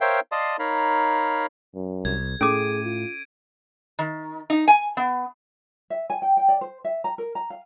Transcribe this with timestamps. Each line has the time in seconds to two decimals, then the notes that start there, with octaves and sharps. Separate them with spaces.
0.01 A#4 C5 C#5 E5 F5 G5
0.32 D5 D#5 F5 A5 C6 D#6
0.59 D#4 A#4 C#5 F5 A#5 B5
1.75 F#2
2.05 C2 G#6
2.41 A2 C#4 G#4 A4 D6 D7 D#7
2.84 F4
3.99 D#3
4.50 D#4
4.68 G#5
4.97 B3
5.90 E5
6.10 G#5
6.22 G5
6.37 G5
6.48 D5
6.61 C5
6.84 E5
7.04 A#5
7.18 A#4
7.35 A#5
7.50 F5